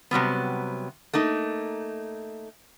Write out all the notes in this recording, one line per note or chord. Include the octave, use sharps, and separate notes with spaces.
C3 F#3 G3 B3
A3 A#3 D#4